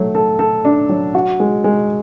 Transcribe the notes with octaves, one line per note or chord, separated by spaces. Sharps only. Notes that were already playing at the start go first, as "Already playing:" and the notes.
Already playing: F#3 A3
A4
A4
D4
F#3
F#4
G#3
G#3